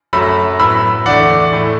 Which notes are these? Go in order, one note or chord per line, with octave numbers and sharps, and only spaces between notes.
F#2 F#3 A3 B5 E6
A2 F#3 B3 B5 E6
E2 D3 A3 D5 F#5
A2 A3